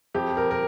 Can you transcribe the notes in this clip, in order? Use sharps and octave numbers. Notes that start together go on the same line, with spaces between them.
F2 G4
A#4
A#4